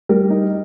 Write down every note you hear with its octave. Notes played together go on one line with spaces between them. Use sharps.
G3 A#4
D#4